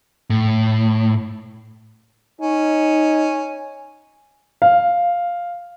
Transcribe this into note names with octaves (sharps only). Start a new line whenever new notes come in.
A2
C#4 D#4
F5